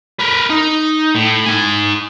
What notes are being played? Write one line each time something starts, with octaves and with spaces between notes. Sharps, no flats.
A#4 B4
D#4
A2
D#4 G#5